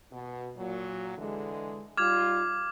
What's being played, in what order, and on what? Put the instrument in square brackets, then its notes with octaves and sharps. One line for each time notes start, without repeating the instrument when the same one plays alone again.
[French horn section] B2
A#2 F#3
D3 E3 G#3
[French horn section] G3 D#4 F4 [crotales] D6 [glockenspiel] F6 G#6 F7